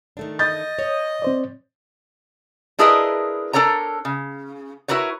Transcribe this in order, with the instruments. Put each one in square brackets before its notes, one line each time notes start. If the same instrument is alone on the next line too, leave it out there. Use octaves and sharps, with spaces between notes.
[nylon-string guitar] D#3 A3 D4
[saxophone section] D#5 [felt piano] B5 G6 A6
[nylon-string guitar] C#5
[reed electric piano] C4 C5 D5
[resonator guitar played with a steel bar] D4 E4 G#4 A#4 B4 D#5
D4 A4 A#4 C#5 A#5
C#3
E4 F#4 A#4 B4 C#5